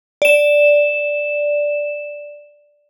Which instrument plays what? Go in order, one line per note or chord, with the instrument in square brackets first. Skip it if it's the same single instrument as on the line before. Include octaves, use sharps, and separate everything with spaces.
[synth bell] D5 E7